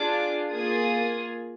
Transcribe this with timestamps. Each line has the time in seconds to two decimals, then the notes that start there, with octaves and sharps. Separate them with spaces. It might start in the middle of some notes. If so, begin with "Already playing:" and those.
Already playing: D4 F4 G#4 D6
0.51 A#3 F4 G#4 D#6